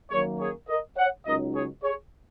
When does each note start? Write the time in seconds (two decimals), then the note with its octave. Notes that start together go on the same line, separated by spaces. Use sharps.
0.11 F#2 D#3 F#3 A#3 G#4 C#5
0.39 G#4 C#5
0.68 A#4 D#5
0.97 C#5 F#5
1.26 C#2 C#3 F#3 D#4 A#4 D#5
1.54 G#4 C#5
1.83 G#4 C#5